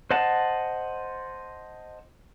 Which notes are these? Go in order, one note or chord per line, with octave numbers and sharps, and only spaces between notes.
C5 D#5 F#5 A5